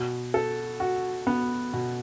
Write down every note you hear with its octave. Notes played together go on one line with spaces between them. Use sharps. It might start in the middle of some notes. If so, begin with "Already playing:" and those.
Already playing: B2
A4
F#4
B3
B2